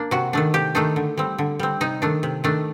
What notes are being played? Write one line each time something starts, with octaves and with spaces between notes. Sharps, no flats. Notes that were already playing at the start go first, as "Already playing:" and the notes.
Already playing: A#3 D4
C3 F#4
D#3 A3 D4
C3 G4
D#3 A3 D4 D#4
D3
G3 C4
D3
G3 C4
C3 D#4
D#3 A3 D4
C3
D#3 A3 D4